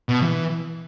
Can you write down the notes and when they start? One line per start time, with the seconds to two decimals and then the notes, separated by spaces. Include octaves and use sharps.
0.09 B2
0.23 E3